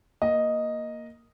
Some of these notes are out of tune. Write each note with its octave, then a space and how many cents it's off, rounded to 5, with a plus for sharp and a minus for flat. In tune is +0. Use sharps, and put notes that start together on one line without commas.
A#3 +0 D#5 +0